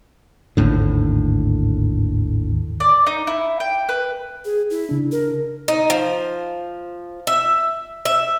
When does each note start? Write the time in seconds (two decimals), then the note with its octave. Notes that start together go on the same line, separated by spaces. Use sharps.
0.57 G#1 D#2 A2 D3
2.80 D5
3.06 D#4
3.27 E4
3.60 G5
3.89 B4
4.45 G#4
4.70 E4
4.89 C#3 D4
5.12 A#4
5.68 D#4
5.90 F3
7.27 E5
8.05 E5